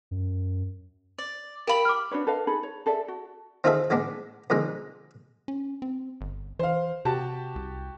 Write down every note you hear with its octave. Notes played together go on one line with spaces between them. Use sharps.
F#2
D5
G4 A#4 F5 B5 F#7
D6 F6
D4 F#4 B4 C#5
A4 B4 D#5 F5
D#4 G#4 A4 B5
C#5
G#4 A4 D5 E5
F#4
C4 D#4 F4 G#4 A4 E5
A1 G#3 B3 D4
F2 B2 D3 G#3 D#4
C#4
C4
G1
E3 C5 F5
C3 F#4 G4 A5
C2